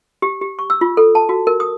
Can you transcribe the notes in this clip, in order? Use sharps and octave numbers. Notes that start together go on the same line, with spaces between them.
G4
G4
C#6
E6
F4
A4
A5
F#4
A#4
D#6